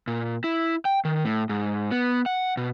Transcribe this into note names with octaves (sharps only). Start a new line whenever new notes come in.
A#2
E4
G5
D#3
A2
G#2
B3
F#5
B2